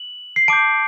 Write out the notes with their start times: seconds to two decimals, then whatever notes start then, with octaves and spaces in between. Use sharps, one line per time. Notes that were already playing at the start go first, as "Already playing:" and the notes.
Already playing: F#7
0.36 C7
0.48 A5 D6 G6 D7